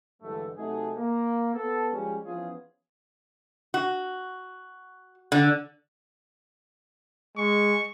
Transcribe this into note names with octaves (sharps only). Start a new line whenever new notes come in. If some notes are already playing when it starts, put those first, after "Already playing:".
G2 D3 E3 F#3 G#3 A3
C3 F#3 A3 D#4 F#4 G#4
A#3
B3 A4
F3 G3 G#3 C#4
E3 F3 B3 C#4 F4 G#4
F#4
D3
G#3 C#6